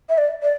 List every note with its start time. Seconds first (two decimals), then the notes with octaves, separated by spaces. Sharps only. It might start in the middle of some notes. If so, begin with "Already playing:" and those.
0.09 E5
0.18 D5
0.43 D5